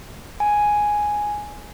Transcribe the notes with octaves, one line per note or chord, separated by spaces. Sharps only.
G#5